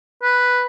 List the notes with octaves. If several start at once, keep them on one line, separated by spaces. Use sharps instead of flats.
B4